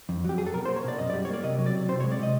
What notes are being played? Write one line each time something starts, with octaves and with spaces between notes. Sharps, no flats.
F2
F#3 G4
F2 G#4
A4
B2 A#4
C5
A#3
C#5
B2 D5
F#2 D#5
G3 D5
C#5
A#3 D5
C3 D#5
F#3
D5
C3
C3 C5
C#5
G#3
D5
C3 D#5